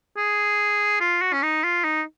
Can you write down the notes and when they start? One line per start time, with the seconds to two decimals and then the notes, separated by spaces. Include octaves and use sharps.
0.17 G#4
1.00 F4
1.21 F#4
1.33 C#4
1.43 D#4
1.64 F4
1.84 D#4